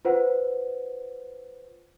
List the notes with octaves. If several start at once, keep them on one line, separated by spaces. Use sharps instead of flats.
F4 B4 C5 F#5